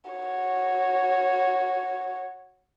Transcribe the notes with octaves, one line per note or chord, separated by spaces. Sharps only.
F#4 C#5